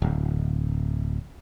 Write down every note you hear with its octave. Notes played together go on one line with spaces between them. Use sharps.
D1